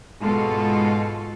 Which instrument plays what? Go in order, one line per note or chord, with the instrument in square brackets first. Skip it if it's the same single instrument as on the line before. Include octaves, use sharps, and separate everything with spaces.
[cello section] G#2 B2 G#3 F4 A4